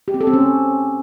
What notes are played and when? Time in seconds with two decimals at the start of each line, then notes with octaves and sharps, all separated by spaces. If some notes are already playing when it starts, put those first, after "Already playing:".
0.08 G4
0.14 C4
0.21 A4
0.27 C4
0.33 C#4